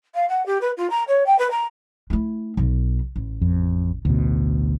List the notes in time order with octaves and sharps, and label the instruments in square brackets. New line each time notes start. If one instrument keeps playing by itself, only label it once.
[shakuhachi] F5
F#5
G4
B4
F4
A#5
C#5
G5
B4
A#5
[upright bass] A3 E4
B1 F4
A1
[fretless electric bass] F2
[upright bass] A1 [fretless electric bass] D2 B2